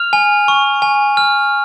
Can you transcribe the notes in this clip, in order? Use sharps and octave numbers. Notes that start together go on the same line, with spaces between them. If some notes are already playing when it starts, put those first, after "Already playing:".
Already playing: F6 F7
G#5
C#6
G#5
F6